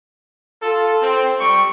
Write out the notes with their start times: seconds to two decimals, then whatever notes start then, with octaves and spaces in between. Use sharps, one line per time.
0.61 F4 A4
1.02 C4
1.40 G3 G5 C#6